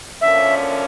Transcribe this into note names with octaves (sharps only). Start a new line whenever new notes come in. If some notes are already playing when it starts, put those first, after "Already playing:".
F#2 D3 F3 A#3 C#4 E5